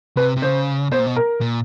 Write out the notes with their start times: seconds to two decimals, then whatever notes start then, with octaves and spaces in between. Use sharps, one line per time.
0.17 C3 B4
0.37 C3
0.42 C#3 C5
0.91 B2 C5
0.99 A#2
1.06 B2
1.16 A#4
1.41 A#2